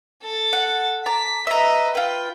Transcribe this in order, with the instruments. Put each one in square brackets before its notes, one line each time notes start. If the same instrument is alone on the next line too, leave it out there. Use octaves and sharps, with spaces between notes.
[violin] A4 A6
[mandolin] F#5
[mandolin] A5 A#5 D6 [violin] B6
[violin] B4 D#5 [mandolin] E5 A#5
[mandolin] F4 B4 [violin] G5